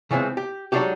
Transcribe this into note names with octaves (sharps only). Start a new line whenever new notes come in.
C#3 E3 F3 G3 G#3 C4
G4
F#3 G#3 D4 D#4 F#4 G4